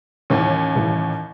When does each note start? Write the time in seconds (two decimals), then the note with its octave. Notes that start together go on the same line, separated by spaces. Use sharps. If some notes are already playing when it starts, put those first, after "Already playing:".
0.30 A1 D#2 C#4
0.75 A1